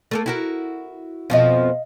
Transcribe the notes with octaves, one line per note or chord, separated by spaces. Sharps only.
A3 A#3 A4
E4 F#4 A#4
F2 B2 F3 D#5 F5